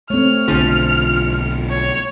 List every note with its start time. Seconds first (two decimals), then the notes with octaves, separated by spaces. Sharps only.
0.10 A3 C4 C#5 F6
0.48 B1 D3 F3
1.70 C#5